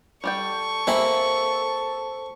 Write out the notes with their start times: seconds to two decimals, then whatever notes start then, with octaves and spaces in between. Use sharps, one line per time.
0.24 G3 A4 D5 G5 C#6
0.87 A#3 C4 G4 E5 G#5 B5